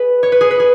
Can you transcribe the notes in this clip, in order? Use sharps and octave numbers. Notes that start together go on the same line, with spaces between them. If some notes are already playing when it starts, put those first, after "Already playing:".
Already playing: G#4 B4
C#5
B4
G#4
B4
G#4